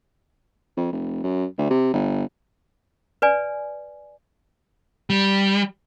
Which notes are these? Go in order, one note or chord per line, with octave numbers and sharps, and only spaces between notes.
F2
F1
F#2
D2
C3
G1
B4 D5 G#5
G3